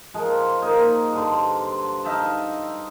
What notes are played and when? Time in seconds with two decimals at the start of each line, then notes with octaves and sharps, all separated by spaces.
0.14 F3 G#3 A#4
0.62 A#3 D#4 G#4 A#4
1.13 G2 D3 C5
2.05 D#4 E5 F5 A5